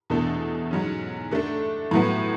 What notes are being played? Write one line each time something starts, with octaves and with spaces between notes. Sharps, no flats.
E2 B2 A3 D4 A4
G#2 F#3 C#4
D3 A3 D4
A2 F#3 B3